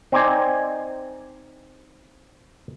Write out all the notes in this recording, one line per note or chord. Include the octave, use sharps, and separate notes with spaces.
C4 D#4 C5 D5 G#5